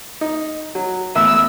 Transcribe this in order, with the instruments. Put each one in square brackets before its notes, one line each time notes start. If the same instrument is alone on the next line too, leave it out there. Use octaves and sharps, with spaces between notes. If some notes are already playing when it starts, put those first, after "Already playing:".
[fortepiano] D#4
F#3
[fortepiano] A1 E2 [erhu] E6